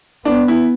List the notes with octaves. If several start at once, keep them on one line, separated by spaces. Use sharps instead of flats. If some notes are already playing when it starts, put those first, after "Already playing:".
B3 D4
E4